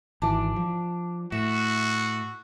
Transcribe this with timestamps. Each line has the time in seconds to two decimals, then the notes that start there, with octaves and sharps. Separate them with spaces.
0.22 G#1 E3 D4
0.56 F3
1.32 A2 F#4 E5